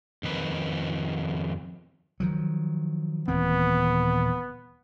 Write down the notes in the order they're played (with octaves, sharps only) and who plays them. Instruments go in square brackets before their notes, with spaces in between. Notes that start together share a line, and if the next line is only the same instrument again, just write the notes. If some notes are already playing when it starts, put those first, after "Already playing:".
[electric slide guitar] F2 D#3 B4
[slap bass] D#3 F3 F#3
[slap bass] D#1 E3 C4 [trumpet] B3